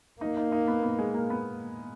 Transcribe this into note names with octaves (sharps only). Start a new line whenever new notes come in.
A#3 D#4
D#4
D#4
B3
B3
G#3
A#3
B3